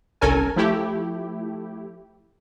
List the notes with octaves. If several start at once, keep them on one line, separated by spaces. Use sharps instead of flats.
G1 C2 C#4 A4 A#4 G#5
F3 A3 E4 G4